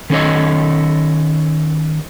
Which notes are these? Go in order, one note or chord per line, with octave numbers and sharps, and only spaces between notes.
D#3 C#4 D#4 A4 C#5 D#5